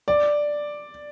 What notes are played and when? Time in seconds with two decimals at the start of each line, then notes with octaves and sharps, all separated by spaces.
0.08 D5